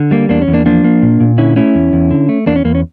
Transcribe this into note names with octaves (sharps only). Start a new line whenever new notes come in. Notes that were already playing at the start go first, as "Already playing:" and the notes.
Already playing: D3
G3 A#3
E2 A#3 D4
C#4
E2
A#3 D4
F3 A#3 D4
A#3
A#2
A#2
D3 C#4 E4
A3 C#4 E4
E2
E2
D3
A3
E2 A#3 D4
C#4
E2 A#3
C#4